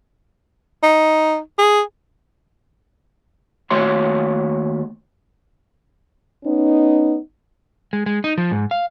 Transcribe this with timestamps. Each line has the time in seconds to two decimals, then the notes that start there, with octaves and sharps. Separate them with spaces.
0.83 D#4
1.59 G#4
3.70 D#2 A3 F#4 C#5 E5 C6
6.44 B3 C#4 D#4
7.93 G#3
8.06 G#3
8.24 D#4
8.38 F3
8.51 G#2
8.71 F5